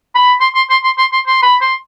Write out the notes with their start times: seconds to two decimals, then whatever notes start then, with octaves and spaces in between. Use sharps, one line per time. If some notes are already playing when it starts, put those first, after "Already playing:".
0.15 B5
0.41 C6
0.55 C6
0.70 C6
0.84 C6
0.98 C6
1.12 C6
1.27 C6
1.43 B5
1.61 C6